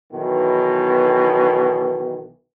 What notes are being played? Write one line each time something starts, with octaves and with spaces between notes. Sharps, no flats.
B1 B2 D#3 E3